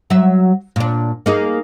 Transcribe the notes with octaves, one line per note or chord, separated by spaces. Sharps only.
F#3 E5
A#2 D4
A#3 D#4 G#4